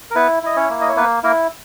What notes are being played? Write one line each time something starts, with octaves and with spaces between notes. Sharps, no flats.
A#4
B3 E4 B4
E4 D#5
C#4 C#5
A#3
D#5
C#5
A#3 B3 B4
A#3 E4 A#4